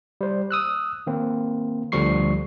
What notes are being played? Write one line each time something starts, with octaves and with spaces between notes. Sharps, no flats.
G3 C5
D#6 E6 F#6
D#3 A#3 C4
D2 D3 F3 G3 C#6 C7